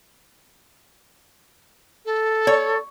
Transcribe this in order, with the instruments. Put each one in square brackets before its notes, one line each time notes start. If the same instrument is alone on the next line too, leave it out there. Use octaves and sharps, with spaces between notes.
[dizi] A4
[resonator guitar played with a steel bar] C#5